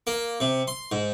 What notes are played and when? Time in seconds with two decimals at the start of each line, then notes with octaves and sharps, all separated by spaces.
0.07 A#3
0.40 C3
0.68 C6
0.92 G#2